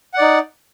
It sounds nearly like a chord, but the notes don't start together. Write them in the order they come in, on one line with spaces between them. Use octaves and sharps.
F#5 D5 D#4